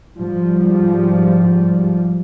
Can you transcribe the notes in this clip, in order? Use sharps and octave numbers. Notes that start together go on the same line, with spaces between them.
G#2 F3 G3